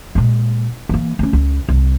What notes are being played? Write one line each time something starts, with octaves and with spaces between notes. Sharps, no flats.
A#2 G#3
E3 A#3
A3 C#4
C#2
C2